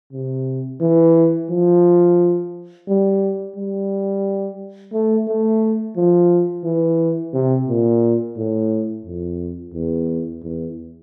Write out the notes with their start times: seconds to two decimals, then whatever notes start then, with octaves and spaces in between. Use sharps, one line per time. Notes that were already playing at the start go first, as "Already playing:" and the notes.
0.13 C3
0.81 E3
1.50 F3
2.88 G3
3.56 G3
4.93 A3
5.28 A3
5.97 F3
6.64 E3
7.33 C3
7.68 A#2
8.37 A2
9.05 F2
9.74 E2
10.42 E2